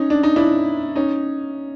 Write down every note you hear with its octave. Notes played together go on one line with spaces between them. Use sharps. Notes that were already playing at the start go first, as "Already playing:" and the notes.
Already playing: C#4 D#4
D4
D#4
D4 E4
C#4 D#4